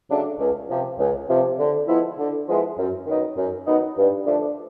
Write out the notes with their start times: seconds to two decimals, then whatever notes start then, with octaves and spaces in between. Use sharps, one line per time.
0.09 C#3 F#3 A3 D4
0.39 C#2
0.69 C3 F3
0.99 C#2
1.29 C3 F3
1.59 D3
1.88 F3 G#3 B3 E4
2.18 D3
2.47 F3 G#3 B3 E4
2.77 F#2
3.07 D#3 F#3 B3 D#4
3.37 F#2
3.66 D#3 F#3 B3 D#4
3.97 G2
4.26 D3 F3 A3 D4